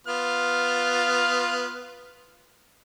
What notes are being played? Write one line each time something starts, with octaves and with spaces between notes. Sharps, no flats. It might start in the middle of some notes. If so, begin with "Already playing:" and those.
B3 F4 F6